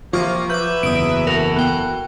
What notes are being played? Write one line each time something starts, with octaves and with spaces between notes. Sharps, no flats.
C3 F3 A#3 C#6 D6 F6
F#3 B4 E5 D6 G6
F#1 E2 D#6 D7
E3 F#4 A4 A#4
B3 G5